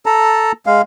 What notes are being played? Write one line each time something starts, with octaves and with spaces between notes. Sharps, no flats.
A4 A5 A#5
G#3 F5